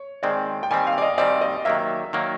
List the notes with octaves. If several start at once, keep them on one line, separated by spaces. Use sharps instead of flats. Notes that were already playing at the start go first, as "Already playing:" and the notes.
Already playing: C#5
D#3 G#3 C4 D5
G5
D#3 G3 C4 G#5
F5
D5
D#5
D#3 G3 C4 D5
D#5
D#3 F#3 A#3 E5
D#3 F#3 A#3